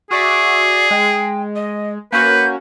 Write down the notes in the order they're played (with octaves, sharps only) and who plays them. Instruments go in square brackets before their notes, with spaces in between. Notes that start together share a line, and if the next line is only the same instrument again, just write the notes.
[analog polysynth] F#4 D5 E5 [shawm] G#4 [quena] C#6
[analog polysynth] G#3 [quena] G5
[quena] D#5
[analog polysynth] A#3 C#4 F#4 [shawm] B4 [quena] G6